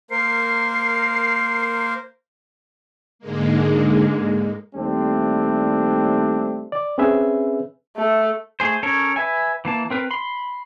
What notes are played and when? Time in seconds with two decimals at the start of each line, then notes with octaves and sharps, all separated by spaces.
0.11 A#3 A#4 C5 C7
3.19 G#2 D3 G#3 A#3
4.75 D#2 G3 A3 C4 D4
6.72 D5
6.98 C4 C#4 G#4 B4 E5
7.97 A3
8.60 A3 G#4 C5
8.83 C#4 A4 A#4 C#5
9.16 B4 E5 G#5
9.65 E3 A#3 A5
9.90 C4 A#4 B4
10.11 B5 C6